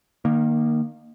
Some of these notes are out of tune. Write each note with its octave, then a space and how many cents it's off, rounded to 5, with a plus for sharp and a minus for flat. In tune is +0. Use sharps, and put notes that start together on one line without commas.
D#3 -25 A#3 +0